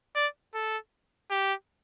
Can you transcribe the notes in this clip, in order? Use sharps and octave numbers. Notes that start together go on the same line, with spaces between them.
D5
A4
G4